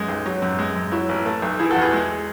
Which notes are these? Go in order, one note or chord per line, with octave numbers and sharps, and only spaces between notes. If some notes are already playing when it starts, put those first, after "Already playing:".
Already playing: F#2 G#3
B1
F#3
F#2
G#3
F#2
F#3 E4
A1
A3
B1
E3 E4 G#4
F#4 A4
E2
G#4 B4
G#3